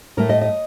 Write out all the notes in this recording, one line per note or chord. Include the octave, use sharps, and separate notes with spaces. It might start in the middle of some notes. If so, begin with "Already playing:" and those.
A2 A3 A#4
D#5
D#5